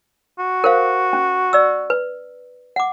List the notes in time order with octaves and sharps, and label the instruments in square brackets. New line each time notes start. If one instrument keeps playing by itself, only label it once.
[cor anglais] F#4
[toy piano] A#4 C5 F5
C#4
D5 E6
B4
F#5 D6